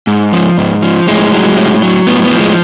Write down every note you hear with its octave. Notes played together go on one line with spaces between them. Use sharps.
G#2
F3
G#2
F3
A2 G#3
F#3
A2
F#3
A2 B3
B3
F3
G#3